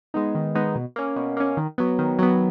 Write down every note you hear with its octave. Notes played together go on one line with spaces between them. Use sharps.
G#3 B3 D#4
D#3
G#3 B3 D#4
B2
A#3 C#4
B2
A#3 C#4
D#3
F#3 B3
D#3
F#3 B3